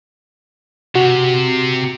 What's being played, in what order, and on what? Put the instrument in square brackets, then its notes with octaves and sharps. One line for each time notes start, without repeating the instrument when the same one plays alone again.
[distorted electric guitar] C3 [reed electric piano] F#4